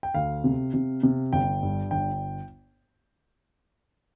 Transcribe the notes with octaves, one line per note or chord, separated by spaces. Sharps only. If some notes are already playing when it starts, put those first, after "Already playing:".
G5
D2 F5
C3
C3
C3
G1 G5
G2
G1 G5